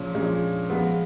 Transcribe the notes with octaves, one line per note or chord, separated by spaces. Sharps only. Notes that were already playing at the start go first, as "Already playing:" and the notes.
Already playing: A#2 F3 G#3 C#4
A#2 F3 G#3 C#4
F3 G#3 B3